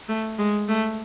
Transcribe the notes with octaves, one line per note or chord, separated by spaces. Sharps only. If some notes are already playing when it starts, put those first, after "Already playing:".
A3
G#3
A3